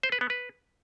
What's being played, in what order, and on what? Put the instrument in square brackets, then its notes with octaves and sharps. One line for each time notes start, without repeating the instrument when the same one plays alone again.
[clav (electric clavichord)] C5
B4
B3
B4